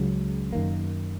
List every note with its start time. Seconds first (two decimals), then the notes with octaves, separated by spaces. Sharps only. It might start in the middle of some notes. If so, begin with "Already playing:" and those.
Already playing: C#2 C#3 F#3 C#4
0.53 F#2 D#3 A#3